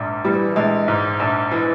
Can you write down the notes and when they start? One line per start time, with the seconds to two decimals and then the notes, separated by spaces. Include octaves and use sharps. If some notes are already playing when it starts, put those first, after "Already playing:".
Already playing: A#1 G#2
0.25 E3 G3
0.56 A#1 G#3
0.88 G#2
1.20 A#1
1.52 E3